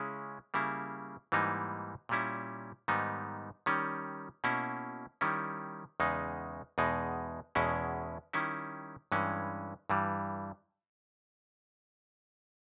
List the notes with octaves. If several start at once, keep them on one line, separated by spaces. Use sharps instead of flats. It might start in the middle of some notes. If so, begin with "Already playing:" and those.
Already playing: C#3 G#3 C#4 E4
C#3 G3 A#3 E4
G#2 E3 G3 A#3 D#4
A#2 G3 C#4 E4
G#2 D#3 G3 B3 D#4
D#3 G3 C#4
B2 A#3 C#4 E4
D#3 G3 C#4 E4
E2 C#3 G#3 D#4
E2 B2 G#3 D#4
E2 B2 G#3 C#4 E4
D#3 G3 C#4 E4
G2 E3 G#3 C#4
G2 E3 G3